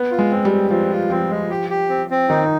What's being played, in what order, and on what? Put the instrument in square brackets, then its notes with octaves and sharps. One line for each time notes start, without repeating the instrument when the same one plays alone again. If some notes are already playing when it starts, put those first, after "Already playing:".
Already playing: [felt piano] B3
[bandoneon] F4
[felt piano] G#3
[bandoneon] C4
[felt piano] G3
[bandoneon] C4
[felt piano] F3 [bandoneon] C4
[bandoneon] F4
[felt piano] F3 [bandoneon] C4
[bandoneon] G#3
G4
G4
C4
C4
[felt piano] D#3 [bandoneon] D#4